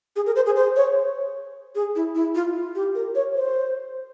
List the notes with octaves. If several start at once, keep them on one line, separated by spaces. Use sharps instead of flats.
G#4
A#4
C5
G#4
C5
C#5
G#4
E4
E4
F4
F4
G4
A#4
C#5
C5